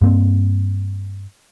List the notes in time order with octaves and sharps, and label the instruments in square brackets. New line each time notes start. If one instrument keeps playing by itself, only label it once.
[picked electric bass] G2 A#3 C4